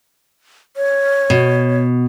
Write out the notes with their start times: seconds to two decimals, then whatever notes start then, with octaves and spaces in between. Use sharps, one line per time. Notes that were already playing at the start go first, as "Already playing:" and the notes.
0.77 C#5
1.30 B2